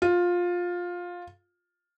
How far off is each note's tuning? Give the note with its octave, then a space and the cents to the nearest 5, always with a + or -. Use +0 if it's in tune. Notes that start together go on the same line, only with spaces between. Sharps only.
F4 +15